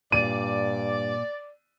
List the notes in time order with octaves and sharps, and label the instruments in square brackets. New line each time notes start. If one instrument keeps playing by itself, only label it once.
[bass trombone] G2 [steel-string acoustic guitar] A#2 [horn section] D5 [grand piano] D#7